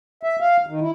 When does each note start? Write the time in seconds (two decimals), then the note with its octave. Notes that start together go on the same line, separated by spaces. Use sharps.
0.23 E5
0.40 F5
0.67 D#3
0.81 E4